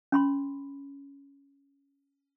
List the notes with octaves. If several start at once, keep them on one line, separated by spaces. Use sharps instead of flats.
C#4 B5 C6